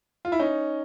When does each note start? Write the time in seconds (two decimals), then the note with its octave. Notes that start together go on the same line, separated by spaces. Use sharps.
0.25 F4
0.32 E4
0.39 C#4 D#4